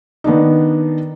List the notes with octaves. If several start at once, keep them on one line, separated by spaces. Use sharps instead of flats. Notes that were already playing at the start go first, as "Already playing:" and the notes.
D#3 B3 D4 D#4